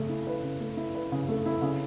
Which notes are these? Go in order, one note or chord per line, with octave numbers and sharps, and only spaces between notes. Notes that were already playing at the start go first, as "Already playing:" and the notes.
Already playing: C#3 A3
E4
B4
C#3
A3
E4
B4
C#3
A3
E4
C#3